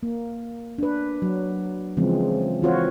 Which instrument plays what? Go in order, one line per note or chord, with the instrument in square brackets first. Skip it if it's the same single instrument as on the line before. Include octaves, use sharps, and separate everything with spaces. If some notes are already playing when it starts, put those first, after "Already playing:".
[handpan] A#3
D4 B4
F#3
C#3 E3 F3 G#3 C4
E3 C4 F4 F#4 C5 C#5